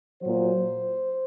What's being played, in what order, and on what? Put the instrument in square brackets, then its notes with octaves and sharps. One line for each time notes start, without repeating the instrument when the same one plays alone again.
[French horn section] A#2 F#3 C5